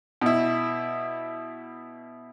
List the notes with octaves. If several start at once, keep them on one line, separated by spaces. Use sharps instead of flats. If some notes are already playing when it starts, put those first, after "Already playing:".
B2 E4